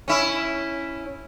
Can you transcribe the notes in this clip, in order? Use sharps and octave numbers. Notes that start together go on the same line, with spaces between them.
C#4 E4